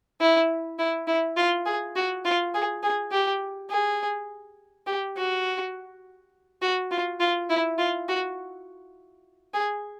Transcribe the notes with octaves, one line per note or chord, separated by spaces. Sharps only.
E4
E4
E4
F4
G#4
F#4
F4
G#4
G#4
G4
G#4
G4
F#4
F#4
F4
F4
E4
F4
F#4
G#4